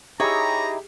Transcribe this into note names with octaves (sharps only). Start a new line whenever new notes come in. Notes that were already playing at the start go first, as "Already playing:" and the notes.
D#4 E4 G4 G#4 C#5 A#5